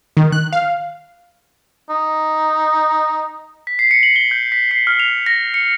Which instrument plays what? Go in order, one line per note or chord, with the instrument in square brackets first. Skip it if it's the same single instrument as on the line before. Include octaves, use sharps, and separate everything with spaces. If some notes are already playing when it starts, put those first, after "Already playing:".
[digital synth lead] D#3
F#6
F5
[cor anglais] D#4
[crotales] B6
C7
C#7
F#7
G7
G6
B6
C7
F6
F7
A#6
C#7